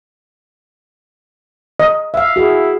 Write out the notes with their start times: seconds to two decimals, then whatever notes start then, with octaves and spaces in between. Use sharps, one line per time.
1.80 D#5
2.14 E5 F5
2.36 E4 F#4 G#4